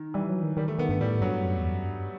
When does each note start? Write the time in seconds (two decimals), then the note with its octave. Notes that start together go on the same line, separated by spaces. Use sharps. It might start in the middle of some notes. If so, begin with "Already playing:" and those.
Already playing: D#3
0.14 E3 G3
0.29 F#3
0.43 D#3
0.57 D#3 G3
0.68 A3
0.79 D#3 B3
0.89 G2 A3
1.01 A2 G3
1.21 G2 F#3
1.44 F#2
1.57 E2
1.73 F#2
1.86 G2